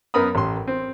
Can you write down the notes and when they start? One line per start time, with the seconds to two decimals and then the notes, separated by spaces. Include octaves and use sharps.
0.14 F#2 B3 A#4 B5 D#6
0.35 A1 C6
0.68 C4